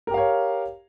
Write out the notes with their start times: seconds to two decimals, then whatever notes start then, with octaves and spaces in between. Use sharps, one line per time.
0.07 A#4
0.11 G4
0.14 F5
0.18 C#5